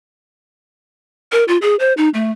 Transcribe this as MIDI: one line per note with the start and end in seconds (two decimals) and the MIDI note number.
1.32 1.44 70
1.48 1.57 65
1.62 1.76 68
1.79 1.93 72
1.97 2.09 63
2.14 2.31 57